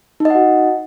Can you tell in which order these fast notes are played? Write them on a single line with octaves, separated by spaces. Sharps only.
D#4 D#5 F#5 F#4